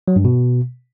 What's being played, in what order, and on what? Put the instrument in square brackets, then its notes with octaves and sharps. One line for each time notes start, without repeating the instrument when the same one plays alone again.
[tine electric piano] F#3
G2
B2